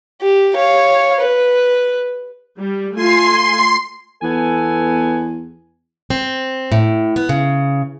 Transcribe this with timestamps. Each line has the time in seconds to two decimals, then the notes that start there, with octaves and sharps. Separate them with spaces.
0.22 G4
0.54 C#5 F5
1.21 B4
2.59 G3
2.96 A3 F4 G#5 C6
4.22 E2 B3 A4 G#5
6.10 C4
6.72 A2
7.16 B3
7.29 C#3